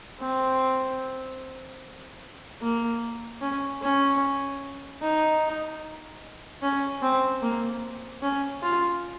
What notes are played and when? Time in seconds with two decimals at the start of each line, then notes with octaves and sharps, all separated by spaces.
0.20 C4
2.62 A#3
3.41 C#4
3.82 C#4
5.02 D#4
6.62 C#4
7.02 C4
7.42 A#3
8.22 C#4
8.62 F4